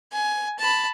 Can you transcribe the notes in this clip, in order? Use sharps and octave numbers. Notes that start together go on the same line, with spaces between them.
G#5
A5 B5